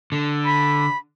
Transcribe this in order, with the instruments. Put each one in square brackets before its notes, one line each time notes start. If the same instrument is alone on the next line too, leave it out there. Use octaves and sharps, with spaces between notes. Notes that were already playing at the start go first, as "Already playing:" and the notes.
[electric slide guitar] D3
[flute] B5